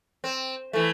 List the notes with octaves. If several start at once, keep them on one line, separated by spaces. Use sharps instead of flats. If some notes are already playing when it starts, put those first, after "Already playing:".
C4
E3 A3